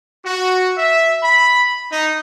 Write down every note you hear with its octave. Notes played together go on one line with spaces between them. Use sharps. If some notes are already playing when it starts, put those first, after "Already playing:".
F#4
E5
B5
D#4